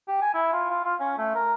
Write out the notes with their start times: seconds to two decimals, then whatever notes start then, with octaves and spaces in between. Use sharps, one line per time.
0.08 G4
0.22 G#5
0.34 E4
0.53 F4
0.70 F4
0.84 F4
1.00 C#4
1.18 A3
1.35 A#4